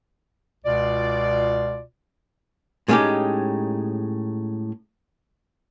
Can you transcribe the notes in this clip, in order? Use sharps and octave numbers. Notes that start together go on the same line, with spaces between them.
C#2 B2 F4 D5
A2 G#3 B3 C#4 D#4 G4